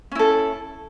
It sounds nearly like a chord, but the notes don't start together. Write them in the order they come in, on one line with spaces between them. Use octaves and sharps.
C#4 E4 A4